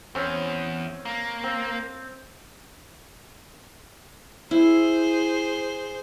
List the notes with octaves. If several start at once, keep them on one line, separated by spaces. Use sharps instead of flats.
E2 C4 C#4 C5
A#3
C4
E4 G#4 C5